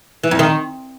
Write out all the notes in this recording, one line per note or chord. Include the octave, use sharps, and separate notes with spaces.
E3
F2
D#3